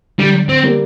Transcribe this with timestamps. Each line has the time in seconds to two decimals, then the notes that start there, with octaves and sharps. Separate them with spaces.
0.18 D3 G3
0.49 C4
0.63 G3 A#3